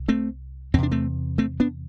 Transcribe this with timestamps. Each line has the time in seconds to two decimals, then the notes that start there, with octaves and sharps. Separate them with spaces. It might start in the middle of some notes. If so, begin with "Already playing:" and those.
Already playing: C2
0.08 A3 C4
0.74 E2 C4
0.78 C3 D4
0.91 A3 C4
1.38 A3 C4
1.60 B3 D4